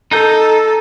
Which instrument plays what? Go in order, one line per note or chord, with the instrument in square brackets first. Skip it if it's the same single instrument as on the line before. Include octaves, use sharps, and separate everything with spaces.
[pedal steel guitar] D#4 A#5 G6 [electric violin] A4